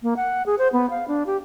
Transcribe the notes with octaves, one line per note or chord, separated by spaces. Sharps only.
A#3
F#5
G#4
C5
B3
F5
D4
G4